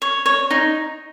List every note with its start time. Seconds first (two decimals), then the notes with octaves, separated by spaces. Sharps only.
0.02 C#5
0.26 C#5
0.51 D#4